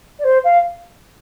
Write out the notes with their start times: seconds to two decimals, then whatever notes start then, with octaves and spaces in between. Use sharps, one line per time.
0.19 D5
0.24 C5
0.44 F5